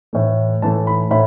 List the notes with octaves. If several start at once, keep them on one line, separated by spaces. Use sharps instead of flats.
A2 E3 A3
A2 E3 A3 A5
B5
A2 B5